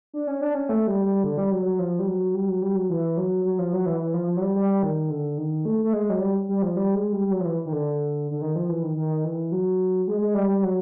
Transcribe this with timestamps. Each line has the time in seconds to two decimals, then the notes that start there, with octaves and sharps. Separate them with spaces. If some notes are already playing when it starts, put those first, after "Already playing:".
0.13 D4
0.27 C#4
0.41 D4
0.55 C#4
0.69 A3
0.87 G3
1.05 G3
1.24 D3
1.38 G3
1.52 F#3
1.65 F#3
1.79 F3
1.99 G3
2.07 F#3
2.34 G3
2.48 F#3
2.62 G3
2.75 F#3
2.90 E3
3.17 F#3
3.45 F#3
3.59 F3
3.73 F#3
3.86 E3
4.00 E3
4.14 F3
4.28 F3
4.37 F#3
4.41 G3
4.55 G3
4.83 D#3
5.10 D3
5.38 D#3
5.65 A3
5.84 A3
5.93 G#3
6.10 F#3
6.20 G3
6.49 G3
6.62 F3
6.76 G3
6.95 G#3
7.13 G3
7.27 G3
7.31 F#3
7.41 F3
7.45 E3
7.66 D#3
7.73 D3
8.31 D3
8.42 D#3
8.56 F3
8.69 E3
8.83 D#3
8.97 D#3
9.24 E3
9.52 F#3
10.07 G#3
10.21 G#3
10.35 G3
10.49 G3
10.63 F#3